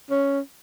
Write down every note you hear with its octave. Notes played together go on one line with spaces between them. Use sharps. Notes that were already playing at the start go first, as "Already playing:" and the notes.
C#4